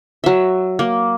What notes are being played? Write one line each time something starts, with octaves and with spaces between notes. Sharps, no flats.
F#3 E5
A#3